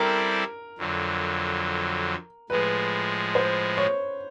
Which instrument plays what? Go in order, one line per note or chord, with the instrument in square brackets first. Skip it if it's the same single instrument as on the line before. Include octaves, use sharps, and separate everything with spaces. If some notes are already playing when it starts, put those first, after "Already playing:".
Already playing: [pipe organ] G3 C4 E4 A4 D5 [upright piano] A#4
[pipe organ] F2 D3 F#3
[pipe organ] A2 F3 G#3 [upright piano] B4
[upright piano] C5
C#5